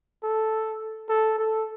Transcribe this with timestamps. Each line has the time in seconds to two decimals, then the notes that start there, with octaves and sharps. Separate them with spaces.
0.23 A4
1.09 A4
1.38 A4